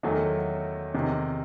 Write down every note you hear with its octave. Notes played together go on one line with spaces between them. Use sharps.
E2 D#3 F#3 A3
E2 C3 D#3